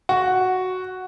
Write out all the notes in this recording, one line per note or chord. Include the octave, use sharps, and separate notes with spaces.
F#4